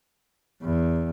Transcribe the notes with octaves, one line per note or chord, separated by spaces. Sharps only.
E2